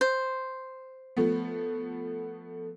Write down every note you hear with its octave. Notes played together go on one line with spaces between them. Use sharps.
C5
F3 A3 B3